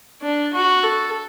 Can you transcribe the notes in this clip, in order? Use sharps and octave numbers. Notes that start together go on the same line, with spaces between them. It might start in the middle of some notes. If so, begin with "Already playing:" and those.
D4
F#4
A4